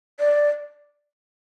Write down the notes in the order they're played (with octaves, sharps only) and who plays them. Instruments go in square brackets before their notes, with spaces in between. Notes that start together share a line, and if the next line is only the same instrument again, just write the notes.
[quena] D5